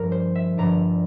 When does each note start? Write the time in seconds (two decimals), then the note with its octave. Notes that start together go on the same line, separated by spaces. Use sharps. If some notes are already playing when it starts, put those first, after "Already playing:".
Already playing: G1 G2 F3 A3 D4 A#4
0.12 C5
0.35 E5
0.58 G1 G2 F3 A3 D4 A#5